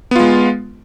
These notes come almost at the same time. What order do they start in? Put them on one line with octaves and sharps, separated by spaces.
B3 F4 G#3